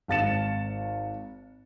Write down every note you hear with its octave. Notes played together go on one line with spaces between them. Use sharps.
G#1 F5 A5 A6 C#7 E7